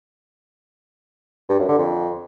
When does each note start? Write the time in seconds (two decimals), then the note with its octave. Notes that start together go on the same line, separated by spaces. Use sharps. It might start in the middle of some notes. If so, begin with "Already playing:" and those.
1.49 G2
1.59 F#2
1.69 D3
1.78 F2